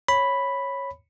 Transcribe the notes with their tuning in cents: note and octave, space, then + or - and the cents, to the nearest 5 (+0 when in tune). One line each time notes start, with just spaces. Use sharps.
C#5 -10 B5 +0